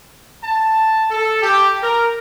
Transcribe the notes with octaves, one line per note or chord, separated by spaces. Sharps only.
A5
A4
G4
A#4